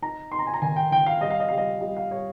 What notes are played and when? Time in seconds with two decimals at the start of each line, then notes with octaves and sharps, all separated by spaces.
0.02 D#4 A#5
0.32 D#4 C6
0.39 A#5
0.47 G#5
0.54 A#5
0.62 D#3 G#5
0.76 G5
0.92 D#3 G5
1.06 F5
1.21 G3 D#5
1.30 F5
1.40 D#5
1.49 G3 F5
1.57 D#5
1.81 G3 D#5
1.97 F5
2.11 G3 C#5